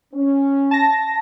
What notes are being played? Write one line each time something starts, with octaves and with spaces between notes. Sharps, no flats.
C#4
A5 A#6